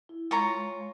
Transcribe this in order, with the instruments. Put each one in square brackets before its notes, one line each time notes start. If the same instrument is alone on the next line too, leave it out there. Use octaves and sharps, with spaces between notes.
[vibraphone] E4
[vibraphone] G#3 [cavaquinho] F4 C#5 A#5